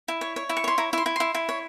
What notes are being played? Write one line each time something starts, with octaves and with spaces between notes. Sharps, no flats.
E4
C#5
C#5
E4
C#6
C#5 C6
E4 A#5
E4
C6
E4
E4 C6
E4
C#5